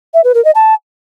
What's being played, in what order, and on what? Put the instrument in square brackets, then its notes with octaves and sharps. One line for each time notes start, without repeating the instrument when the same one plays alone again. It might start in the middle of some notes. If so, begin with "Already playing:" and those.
[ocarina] E5
B4
A#4
D#5
A5